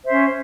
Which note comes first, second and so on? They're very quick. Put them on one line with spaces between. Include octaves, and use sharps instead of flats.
C5 E5 C#4